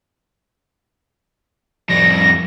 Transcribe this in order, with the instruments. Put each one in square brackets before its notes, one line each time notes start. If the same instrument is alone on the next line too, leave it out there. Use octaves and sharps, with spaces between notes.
[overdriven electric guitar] F2 G3 [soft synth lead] A#6